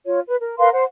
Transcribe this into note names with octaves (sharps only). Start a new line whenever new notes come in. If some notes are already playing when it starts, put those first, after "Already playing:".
F4 C#5
B4
A#4
A#4 B4 F5 C6
C5 F#5